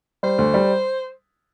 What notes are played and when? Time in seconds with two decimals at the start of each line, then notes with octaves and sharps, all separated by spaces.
0.23 G3 C5
0.38 D2
0.54 G3